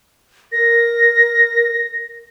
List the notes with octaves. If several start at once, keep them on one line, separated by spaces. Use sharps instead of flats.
A#4 A#6